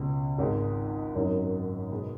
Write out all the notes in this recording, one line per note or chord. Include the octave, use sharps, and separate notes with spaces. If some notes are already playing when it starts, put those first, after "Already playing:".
Already playing: C#2 B2 B3
G#1 G#2 G#3
G#1 F#2 F#3 D#4
B2 G#3 B3